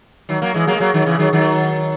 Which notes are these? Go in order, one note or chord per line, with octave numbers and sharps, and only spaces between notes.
D#3 F#3
F#3 A#3
E3 G#3
F#3 A#3
G#3
F#3 A#3
D#3 F#3
C#3 E3
D#3 F#3
D#3 F#3